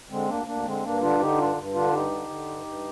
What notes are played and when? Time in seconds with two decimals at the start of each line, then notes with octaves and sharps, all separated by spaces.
0.10 D3 G#3 C4
0.28 D2 A#3 D4
0.47 D2 A#3 D4
0.65 D3 G#3 C4
0.83 G2 A#3 D4
1.01 D3 D4 F4
1.20 D3 D#4 G4
1.38 G2 D4 F4
1.56 G2
1.74 D3 D4 F4
1.93 G2 D#4 G4
2.11 D3
2.30 D3
2.49 G2
2.66 G2